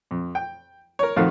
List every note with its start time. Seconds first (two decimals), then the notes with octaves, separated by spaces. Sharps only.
0.11 F2
0.35 G5
0.99 A#4 C#5
1.16 F2 D#3 F3 A3 F#4 F5